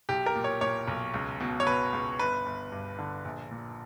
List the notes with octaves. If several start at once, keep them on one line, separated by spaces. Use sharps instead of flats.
B1 G4
A#4
A#2
C#5
A#2 C#5
B1
C#2
B2
C#5
B2 B4
C#2
G1 B4
G1
G2
D3
A#1
A#2